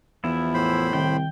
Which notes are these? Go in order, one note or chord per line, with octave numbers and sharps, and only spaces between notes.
E2 F3 E4
A2 C5 B5
C2 D#3 G5